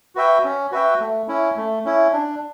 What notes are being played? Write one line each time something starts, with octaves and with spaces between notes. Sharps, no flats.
F#4 B4 E5 G5
C#4
F#4 B4 E5 G5
A3
C#4 E4
A3
C#4 E4
D4